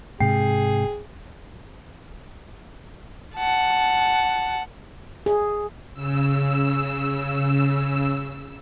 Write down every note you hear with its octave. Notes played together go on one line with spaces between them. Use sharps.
G#2 C3 G#4 G5 C7
F#5 A5
G#4
C#3 E6